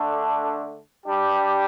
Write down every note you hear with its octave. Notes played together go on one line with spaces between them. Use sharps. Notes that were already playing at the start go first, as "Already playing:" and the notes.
Already playing: D3 A3 D4
G3 D4 G4